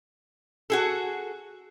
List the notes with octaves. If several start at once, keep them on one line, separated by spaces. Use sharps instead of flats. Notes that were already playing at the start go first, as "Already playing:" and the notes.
F#4 G#4 A4